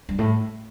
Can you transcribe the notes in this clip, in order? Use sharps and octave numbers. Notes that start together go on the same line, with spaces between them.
G2
A2